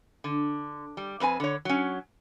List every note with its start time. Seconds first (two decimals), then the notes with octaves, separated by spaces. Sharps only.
0.24 D3
0.97 G3
1.20 F2 C4 B4 G#5
1.40 D3 C#5
1.65 F#3 C#4